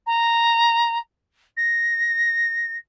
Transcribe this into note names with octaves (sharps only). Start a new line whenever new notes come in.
A#5
A#6